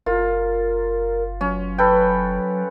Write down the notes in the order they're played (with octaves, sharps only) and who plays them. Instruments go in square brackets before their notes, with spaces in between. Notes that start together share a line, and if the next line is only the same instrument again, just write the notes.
[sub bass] F#1 [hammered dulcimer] F4 [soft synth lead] A#4
[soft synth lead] F#3 [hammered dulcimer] C#4
[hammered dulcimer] A4 B4 G5